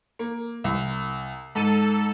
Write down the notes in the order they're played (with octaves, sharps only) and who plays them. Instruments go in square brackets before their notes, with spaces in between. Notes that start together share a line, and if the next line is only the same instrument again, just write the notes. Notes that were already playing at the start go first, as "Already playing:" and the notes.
[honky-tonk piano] A#3
C2
[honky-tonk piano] G#2 D#7 [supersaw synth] A4